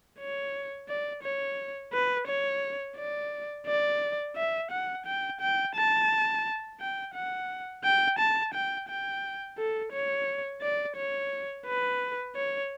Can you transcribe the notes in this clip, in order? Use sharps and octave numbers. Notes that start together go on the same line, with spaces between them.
C#5
D5
C#5
B4
C#5
D5
D5
E5
F#5
G5
G5
A5
G5
F#5
G5
A5
G5
G5
A4
C#5
D5
C#5
B4
C#5